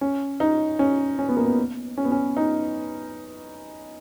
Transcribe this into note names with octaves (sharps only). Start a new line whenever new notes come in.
C#4
D#4
C#4
C#4
B3
A#3
B3
C#4
B3
C#4
D#4